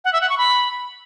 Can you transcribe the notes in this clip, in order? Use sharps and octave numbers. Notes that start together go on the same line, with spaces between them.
F#5
E5
F#5
C#6
B5